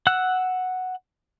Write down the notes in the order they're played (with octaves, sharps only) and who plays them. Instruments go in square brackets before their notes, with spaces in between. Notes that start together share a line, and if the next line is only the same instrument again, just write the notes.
[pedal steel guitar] F#5 E6 F#6